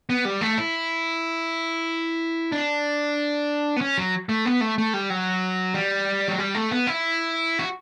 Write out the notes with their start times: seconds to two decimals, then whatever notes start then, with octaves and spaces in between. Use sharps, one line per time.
0.10 B3
0.25 G3
0.41 A3
0.58 E4
2.52 D4
3.76 B3
3.81 C#4
3.97 F#3
4.29 A3
4.46 B3
4.61 A3
4.78 A3
4.94 G3
5.10 F#3
5.74 G3
6.28 F#3
6.38 G3
6.55 A3
6.71 B3
6.87 E4
7.59 F#4